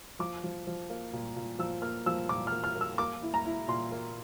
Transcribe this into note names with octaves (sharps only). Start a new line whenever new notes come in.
F3 D6
F3
F3
A#3
A#2
A#2
F3 E6
A#3 F6
F3 E6
A#2 D6
A#3 F6
F6
A#3
E6
A#3 D6
E4
A#5
E4
A#2 C6
A#3